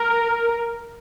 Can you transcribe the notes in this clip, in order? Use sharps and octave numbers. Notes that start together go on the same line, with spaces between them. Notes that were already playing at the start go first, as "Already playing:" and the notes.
Already playing: A#4